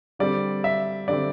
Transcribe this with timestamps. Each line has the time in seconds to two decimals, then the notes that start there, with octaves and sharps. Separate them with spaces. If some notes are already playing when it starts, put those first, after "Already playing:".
0.19 D3 G3 C4 D5
0.64 E5
1.08 D3 G3 C4 D5